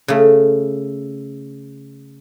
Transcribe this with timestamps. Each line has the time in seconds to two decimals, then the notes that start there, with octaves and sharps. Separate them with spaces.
0.08 C#3 A3